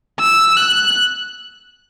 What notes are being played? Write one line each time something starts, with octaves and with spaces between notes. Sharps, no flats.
E6
F#6